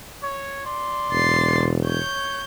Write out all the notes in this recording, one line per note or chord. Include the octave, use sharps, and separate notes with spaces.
C#5
D5 C6
E1 A6 C7
C#5 G6